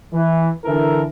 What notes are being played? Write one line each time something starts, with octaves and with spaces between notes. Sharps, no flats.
E3
D3 E3 A4 A#4